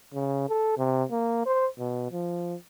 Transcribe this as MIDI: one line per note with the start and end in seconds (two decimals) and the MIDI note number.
0.14 0.45 49
0.49 0.73 69
0.78 1.04 48
1.11 1.41 58
1.46 1.67 72
1.79 2.07 47
2.12 2.55 53